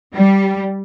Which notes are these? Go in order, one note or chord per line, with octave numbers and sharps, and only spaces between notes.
G3